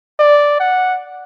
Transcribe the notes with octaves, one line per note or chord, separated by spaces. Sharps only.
D5
F#5